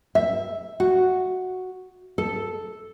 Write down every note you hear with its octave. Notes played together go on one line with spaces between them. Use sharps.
E5
F#4
A4